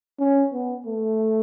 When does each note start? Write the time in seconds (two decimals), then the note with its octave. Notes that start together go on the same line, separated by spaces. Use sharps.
0.20 C#4
0.53 B3
0.86 A3